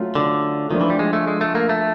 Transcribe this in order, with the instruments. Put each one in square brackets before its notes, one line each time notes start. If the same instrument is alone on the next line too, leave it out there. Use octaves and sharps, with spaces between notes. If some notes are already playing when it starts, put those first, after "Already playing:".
Already playing: [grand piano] F#3 A3 C#4 F4
[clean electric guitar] D3
[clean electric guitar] D#3 [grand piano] F3 A3 D4 F4
[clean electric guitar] E3
G3
G#3
A3
G#3
A3
A#3
A3